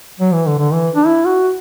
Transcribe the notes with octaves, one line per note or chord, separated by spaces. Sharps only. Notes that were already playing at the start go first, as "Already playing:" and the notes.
F#3
E3
D3
D3
E3
D4
E4
F#4